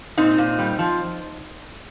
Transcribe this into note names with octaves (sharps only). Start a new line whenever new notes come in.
A#2 C4 D#4
A#2
G3
F3